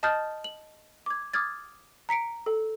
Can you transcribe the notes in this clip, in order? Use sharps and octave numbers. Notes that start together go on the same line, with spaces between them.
D#5 A5 D#6 F6 G6 A6
F#7
D6 G#6
D6 D#6 F6 G#6 A6
A#5 B6 C#7 D7
A4